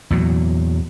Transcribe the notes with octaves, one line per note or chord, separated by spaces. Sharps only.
E2 A#2 F#3